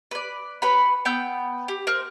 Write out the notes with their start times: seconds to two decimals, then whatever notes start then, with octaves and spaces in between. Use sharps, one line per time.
0.11 B4 D5
0.62 B4 C#5 G5 B5
1.05 B3 G5 E6 G6
1.68 G4
1.87 A#4 C5